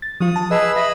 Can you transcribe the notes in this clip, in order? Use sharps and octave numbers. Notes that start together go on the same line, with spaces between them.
A6
F3 F4 D#6
A5
G#4 B4 D#5 E6
D#5 E5 B5